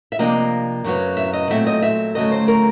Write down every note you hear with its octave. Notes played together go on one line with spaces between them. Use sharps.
E5
C3 F3 A#3 D4 D#5
F#2 C#3 F#3 B3
E5
D#5
A#2 F#3 A3 C4 E5
D#5
E5
D2 C#3 F#3 A3 D#5
C5
A#4